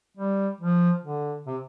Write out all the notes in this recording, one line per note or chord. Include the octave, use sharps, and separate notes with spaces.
G3
F3
D3
C3